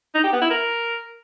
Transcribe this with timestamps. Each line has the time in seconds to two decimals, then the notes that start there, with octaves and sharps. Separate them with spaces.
0.15 D#4
0.24 G4
0.33 B3
0.41 E4
0.50 A#4